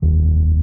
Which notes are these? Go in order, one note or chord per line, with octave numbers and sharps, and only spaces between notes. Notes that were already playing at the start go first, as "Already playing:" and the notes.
F1 D#2 D#3